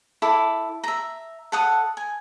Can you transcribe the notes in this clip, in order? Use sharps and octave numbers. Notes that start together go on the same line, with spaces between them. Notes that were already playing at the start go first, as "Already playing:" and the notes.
E4 A4 B5 D6
E5 A#5
A4 F#5 D#6
G#5